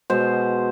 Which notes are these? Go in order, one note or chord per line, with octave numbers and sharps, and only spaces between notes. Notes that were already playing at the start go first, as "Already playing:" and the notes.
B2 G#3 C5